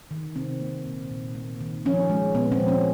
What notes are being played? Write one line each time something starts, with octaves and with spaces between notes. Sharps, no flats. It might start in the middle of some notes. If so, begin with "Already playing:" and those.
D#3
C3 C4
A#3
A#2
A#2
A#3
D#3
F3 C#4
G#3
A#2 B3
C4
F3
C#4